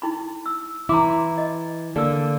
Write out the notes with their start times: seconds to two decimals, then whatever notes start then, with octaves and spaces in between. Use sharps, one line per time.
0.02 D#4 E4 B5
0.46 E6
0.89 E3 E4 A#5 C6 D6
1.38 D#5
1.96 D3 A#3 A4 D5 E6